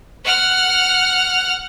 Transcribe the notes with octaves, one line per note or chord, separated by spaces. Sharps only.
F#5 F6